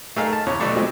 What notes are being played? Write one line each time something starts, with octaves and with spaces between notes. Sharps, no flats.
A3 D#4 G#4 A#4 F5 F6
A5
E2 C#3 C#5
B1 B2 D3 A3 D4 C#6
F3 F#3 G#3 C4